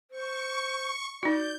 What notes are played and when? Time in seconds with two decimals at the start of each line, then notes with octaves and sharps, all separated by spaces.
0.11 C5 C#6
1.23 D#4 F#4 D5 G6